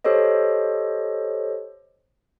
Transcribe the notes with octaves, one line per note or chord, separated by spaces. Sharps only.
G4 A4 C5 C#5 D#5